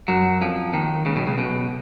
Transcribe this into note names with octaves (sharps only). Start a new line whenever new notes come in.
F#2 F#3
F2 F3
D#2 D#3
C#2 C#3
B1 B2
C#2 C#3
B1 B2